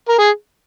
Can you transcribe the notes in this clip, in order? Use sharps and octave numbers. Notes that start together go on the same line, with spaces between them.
A#4
G#4